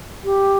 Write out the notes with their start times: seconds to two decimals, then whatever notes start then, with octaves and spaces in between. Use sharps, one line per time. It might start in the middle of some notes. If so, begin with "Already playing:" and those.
0.24 G4